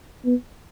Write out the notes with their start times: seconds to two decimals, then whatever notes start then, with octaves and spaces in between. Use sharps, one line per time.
0.25 B3